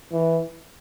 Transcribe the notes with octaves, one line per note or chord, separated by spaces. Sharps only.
E3